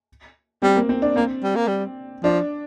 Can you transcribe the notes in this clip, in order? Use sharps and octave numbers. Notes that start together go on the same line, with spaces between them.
G3 C4
A#3
C4
D4
A#3 C4
G3
A#3
G3
F3 D4